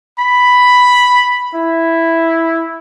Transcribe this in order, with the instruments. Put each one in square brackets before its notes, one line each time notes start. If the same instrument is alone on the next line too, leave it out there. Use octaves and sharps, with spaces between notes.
[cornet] B5
E4